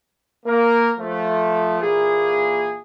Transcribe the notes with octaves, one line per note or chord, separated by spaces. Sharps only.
A#3 A#4
F3 A3
A#2 E3 A#3 G#4